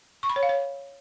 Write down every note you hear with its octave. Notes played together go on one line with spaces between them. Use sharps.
C#6
B5
C#5
F5
C#5